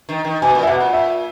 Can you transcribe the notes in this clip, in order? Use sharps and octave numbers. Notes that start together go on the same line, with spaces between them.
D#3
D#3
B2 G#5
A#2
E5
B2 F#5
A#2
E5